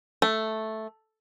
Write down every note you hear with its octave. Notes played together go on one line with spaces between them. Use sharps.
A3